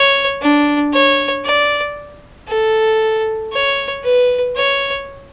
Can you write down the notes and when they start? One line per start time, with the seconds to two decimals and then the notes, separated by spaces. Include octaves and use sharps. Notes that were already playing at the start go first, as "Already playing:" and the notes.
Already playing: C#5
0.42 D4
0.93 C#5
1.45 D5
2.48 A4
3.53 C#5
4.03 B4
4.56 C#5